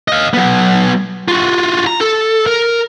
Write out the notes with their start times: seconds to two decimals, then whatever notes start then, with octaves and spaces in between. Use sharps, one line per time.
0.08 D#5 F5
0.34 F#3 B3
1.28 F4 F#4
1.87 A#5
2.01 A4
2.46 A#4